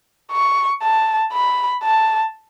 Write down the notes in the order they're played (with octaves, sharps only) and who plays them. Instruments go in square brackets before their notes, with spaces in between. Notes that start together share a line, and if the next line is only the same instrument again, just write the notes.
[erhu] C#6
A5
B5
A5